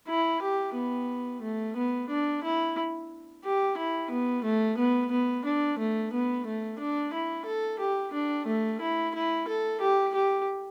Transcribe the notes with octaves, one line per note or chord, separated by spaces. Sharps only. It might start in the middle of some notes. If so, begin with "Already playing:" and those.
E4
G4
B3
A3
B3
D4
E4
G4
E4
B3
A3
B3
B3
D4
A3
B3
A3
D4
E4
A4
G4
D4
A3
E4
E4
A4
G4
G4